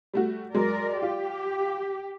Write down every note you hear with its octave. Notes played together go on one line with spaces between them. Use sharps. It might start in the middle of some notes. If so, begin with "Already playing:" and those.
G3 A3 F#4
F#3 G#3 A#4 D5
F4 G4